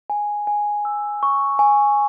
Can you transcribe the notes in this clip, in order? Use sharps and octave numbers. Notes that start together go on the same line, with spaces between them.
G#5
G#5
E6
C#6
G#5